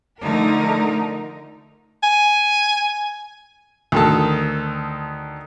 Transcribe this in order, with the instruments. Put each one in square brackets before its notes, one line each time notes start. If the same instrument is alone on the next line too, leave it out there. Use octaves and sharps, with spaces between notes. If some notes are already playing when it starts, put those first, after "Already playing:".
[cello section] D3 F3 A3 D#4 A#4
[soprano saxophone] G#5
[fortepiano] D2 D#3 A4